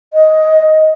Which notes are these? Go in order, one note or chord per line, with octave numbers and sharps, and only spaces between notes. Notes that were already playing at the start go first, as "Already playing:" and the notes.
D#5